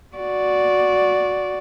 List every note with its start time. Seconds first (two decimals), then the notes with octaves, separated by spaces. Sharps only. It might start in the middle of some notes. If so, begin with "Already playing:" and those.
0.16 F#4 D5